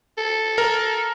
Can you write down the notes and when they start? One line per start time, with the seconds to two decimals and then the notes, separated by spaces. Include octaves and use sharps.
0.18 A4
0.58 A#4